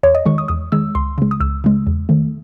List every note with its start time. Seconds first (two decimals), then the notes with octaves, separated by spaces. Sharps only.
0.03 E2 C#5
0.15 D#5
0.25 D#3 G#3 C#6
0.38 D#6
0.48 E2 D#6
0.72 D#3 G#3 E6
0.95 C#2 C6
1.18 C#3 G#3
1.31 D#6
1.40 C#2 E6
1.64 C#3 G#3
1.87 E2
2.09 D#3 A3